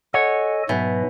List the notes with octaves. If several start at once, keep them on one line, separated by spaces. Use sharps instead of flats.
A4 C#5 D#5 F#5 G#5
G#2 B2 F#3 E5 G#5